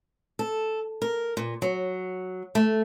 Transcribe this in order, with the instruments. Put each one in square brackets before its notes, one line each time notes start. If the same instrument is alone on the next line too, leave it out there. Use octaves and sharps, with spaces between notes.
[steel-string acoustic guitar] A4
A#4
A#2
F#3
A3